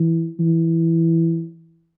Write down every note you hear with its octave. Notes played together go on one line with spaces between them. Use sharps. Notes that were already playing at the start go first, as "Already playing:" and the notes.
Already playing: E3
E3